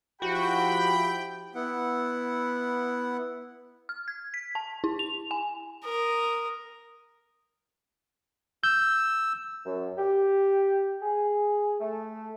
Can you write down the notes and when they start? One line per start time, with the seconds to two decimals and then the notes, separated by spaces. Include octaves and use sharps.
0.22 F3 E4 F#4 G4 G5 B5
1.55 B3 E4 F#5
3.89 F6
4.08 G#6
4.34 B6
4.55 A5
4.84 E4
4.99 F7
5.31 G#5
5.85 A#4 D#6
8.64 E6 G6
9.66 F#2
9.98 G4
11.02 G#4
11.81 A3